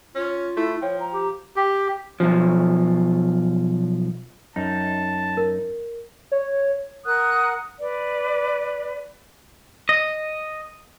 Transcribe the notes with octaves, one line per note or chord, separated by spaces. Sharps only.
C#4 F4
A3 E4
F3 C#5 G5
A#5
G4
G4
B1 F3
F#2 D#4 A5
A#4
C#5
A#4 F#5 D#6 F#6
B4 D5
D#5